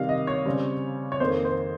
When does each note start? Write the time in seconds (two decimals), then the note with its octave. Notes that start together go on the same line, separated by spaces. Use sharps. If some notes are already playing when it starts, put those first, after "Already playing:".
Already playing: C3 D#3 G3 F5
0.09 D#5
0.27 C#5
0.45 C#3 G3 C4
1.12 C#5
1.20 F2 D#3 A#3 C5
1.45 C5